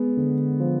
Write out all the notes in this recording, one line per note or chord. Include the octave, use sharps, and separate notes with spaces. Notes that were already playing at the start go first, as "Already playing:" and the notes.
Already playing: G#3 B3
D3
F3